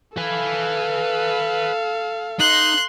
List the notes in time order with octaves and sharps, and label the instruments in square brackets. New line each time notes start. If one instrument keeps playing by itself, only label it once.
[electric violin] A4 F5 [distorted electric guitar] B4 G#5
[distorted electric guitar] D#4 [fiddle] C6 F#6